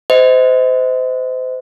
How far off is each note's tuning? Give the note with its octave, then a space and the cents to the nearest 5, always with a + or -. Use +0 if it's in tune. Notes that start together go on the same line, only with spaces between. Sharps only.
C5 -30 D#5 +30